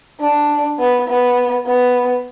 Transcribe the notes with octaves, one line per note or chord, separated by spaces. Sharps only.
D4
B3
B3
B3